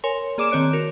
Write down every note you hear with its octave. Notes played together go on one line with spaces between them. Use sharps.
A#4 C#5 G#5 C6
A#3 G#4 D5 D6 D7 E7
D#3 C4 C#5 F#6 D7
F#4 A#4